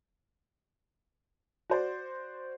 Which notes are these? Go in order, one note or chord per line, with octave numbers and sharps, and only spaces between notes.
F#4 C5 D5